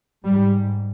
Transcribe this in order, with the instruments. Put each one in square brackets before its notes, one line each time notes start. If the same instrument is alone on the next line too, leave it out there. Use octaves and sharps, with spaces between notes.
[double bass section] G#2 G3